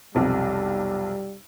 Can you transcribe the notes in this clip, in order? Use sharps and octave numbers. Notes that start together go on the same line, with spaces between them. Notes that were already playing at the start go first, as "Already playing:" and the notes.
B1 F2 C3 G3